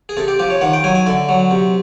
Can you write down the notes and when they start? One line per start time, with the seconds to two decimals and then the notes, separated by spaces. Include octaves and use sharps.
0.09 G#4
0.17 C3 A4
0.28 G4
0.39 F3 G4
0.50 C#5
0.61 D#3 F#5
0.73 G5
0.84 F#3 G#5
0.95 G#5
1.06 D3 E5
1.29 F#3
1.51 C3